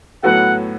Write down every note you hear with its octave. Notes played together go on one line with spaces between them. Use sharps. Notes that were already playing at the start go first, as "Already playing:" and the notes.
A2 F#3 B3 F#4 A4 F#5